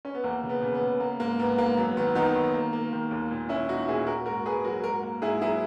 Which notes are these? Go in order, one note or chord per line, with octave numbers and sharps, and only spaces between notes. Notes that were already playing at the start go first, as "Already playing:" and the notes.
C#4
B3
E2 A#3
C#3
B3
C#3
B3
C#3
A#3
G#2 A#3
G#2 B3
G#2 A#3
F#2 B3
D#3 B3
D#3 B3 D#4
D#3
A#3
A#3
D#3
D#2
A#2
A#2 C#4 E4
A#2 D#4 F#4
A#2 E4 G#4
A#3 F#4 A#4
G#2 F#4 A#4
G#2 G#4 B4
F#3 F#4 A#4
G#2 F#4 A#4
A#3
G#2 E4 G#4
F#3 E4 G#4